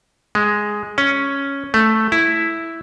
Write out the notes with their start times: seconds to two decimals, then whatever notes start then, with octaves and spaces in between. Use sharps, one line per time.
0.35 G#3
0.98 C#4
1.74 A3
2.12 E4